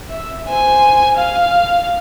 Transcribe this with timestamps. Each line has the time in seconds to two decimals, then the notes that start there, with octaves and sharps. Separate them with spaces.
0.11 E5
0.49 C5 G#5
1.17 F5